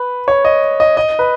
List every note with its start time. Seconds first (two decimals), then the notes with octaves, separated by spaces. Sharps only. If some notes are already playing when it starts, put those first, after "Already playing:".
Already playing: B4
0.28 C#5
0.45 D#5
0.80 D#5
0.97 D#5
1.19 B4